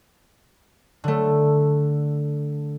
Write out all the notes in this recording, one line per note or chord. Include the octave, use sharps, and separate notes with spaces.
D3 A3